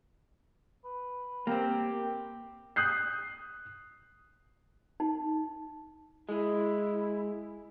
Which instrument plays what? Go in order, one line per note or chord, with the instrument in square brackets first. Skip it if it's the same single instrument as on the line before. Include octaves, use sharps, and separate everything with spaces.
[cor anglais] B4
[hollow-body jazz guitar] A#3 C4 [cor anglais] G4
[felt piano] D#6 F#6 G6 C7
[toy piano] D#4
[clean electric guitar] G#3 [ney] E4